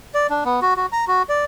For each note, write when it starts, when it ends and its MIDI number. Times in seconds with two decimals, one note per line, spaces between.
0.14 0.27 74
0.30 0.44 62
0.45 0.60 59
0.62 0.74 66
0.77 0.86 66
0.92 1.05 82
1.08 1.22 66
1.29 1.45 74